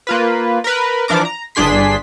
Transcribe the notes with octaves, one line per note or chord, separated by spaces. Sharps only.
A#3 F4 B4
A#4 B4
E3 F3 D4 A#4 D6
A#5
G1 G2 D4 G#4 C6 B6